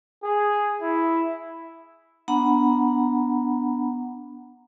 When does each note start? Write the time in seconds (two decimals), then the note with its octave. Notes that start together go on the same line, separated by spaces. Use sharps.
0.24 G#4
0.82 E4
2.28 B3 D4 F#5 A#5 B5